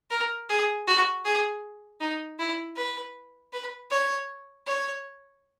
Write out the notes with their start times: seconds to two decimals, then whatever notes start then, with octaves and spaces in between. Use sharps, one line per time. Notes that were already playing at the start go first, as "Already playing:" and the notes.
0.11 A#4
0.49 G#4
0.87 F#4
1.25 G#4
2.01 D#4
2.39 E4
2.76 B4
3.53 B4
3.91 C#5
4.67 C#5